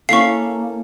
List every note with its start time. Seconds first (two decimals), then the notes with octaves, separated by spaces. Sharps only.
0.09 A#3 C#4 E4 A4 F5 C#6 C7